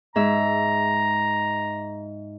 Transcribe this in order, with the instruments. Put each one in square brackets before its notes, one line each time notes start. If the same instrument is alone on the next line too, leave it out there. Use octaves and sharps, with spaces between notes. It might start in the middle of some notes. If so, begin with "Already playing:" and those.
[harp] G#2 E5 [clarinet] A#5